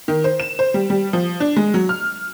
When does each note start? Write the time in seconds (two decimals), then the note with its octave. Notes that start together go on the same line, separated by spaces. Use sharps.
0.08 D#3
0.24 C5
0.40 E7
0.59 C5
0.74 G3
0.90 G3
1.13 F3
1.40 D4
1.57 G#3
1.74 F#3
1.89 F6